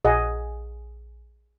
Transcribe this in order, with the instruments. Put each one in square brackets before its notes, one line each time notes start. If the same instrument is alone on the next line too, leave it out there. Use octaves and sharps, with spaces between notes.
[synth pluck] A#1 [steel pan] G#4 D#5 F#5